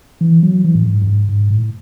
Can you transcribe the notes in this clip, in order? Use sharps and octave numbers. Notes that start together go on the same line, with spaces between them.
E3
F#3
E3
A2
G#2
F#2
G#2
G#2
A2